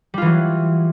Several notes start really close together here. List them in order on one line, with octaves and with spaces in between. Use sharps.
G3 F4 E3 F#3